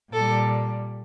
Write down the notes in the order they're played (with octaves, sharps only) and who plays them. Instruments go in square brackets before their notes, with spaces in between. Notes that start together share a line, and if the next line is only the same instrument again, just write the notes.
[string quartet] A#2 G3 A4